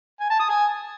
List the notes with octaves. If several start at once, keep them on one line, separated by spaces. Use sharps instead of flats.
G#5
A5
D#6
G#5